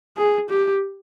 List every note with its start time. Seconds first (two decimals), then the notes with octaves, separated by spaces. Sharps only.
0.17 G#4
0.49 G4